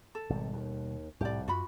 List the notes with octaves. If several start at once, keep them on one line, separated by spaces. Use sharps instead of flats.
A4
G#1 B2 G3
D#2
C2 F2 A2 G4 D5
F#2 F4 F#4 B5